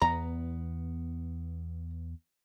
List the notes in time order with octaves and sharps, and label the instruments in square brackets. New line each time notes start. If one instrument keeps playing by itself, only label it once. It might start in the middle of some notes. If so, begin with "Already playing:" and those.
[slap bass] E2 B3 [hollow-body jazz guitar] A#5